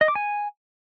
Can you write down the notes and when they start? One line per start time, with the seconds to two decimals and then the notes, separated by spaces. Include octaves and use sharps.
0.01 D#5
0.08 D6
0.15 G#5